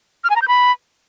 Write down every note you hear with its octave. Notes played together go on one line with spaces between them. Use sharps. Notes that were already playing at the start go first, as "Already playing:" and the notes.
F6
G#5
A#5
G6
B5